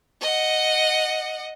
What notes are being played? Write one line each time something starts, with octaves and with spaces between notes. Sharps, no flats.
D#5 F#5